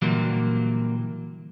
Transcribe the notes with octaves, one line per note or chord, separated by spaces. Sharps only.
A#2 D3 E3 F#3 G3 A#3